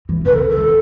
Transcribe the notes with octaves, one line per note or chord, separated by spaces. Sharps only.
E3
C#3 B4
A4
A4
D#3